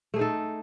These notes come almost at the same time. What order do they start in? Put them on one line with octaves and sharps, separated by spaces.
A3 G#4 D#4 A4